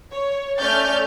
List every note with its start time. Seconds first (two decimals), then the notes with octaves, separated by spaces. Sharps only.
0.12 C#5
0.60 A3 C#4 D5 F6 G6 A6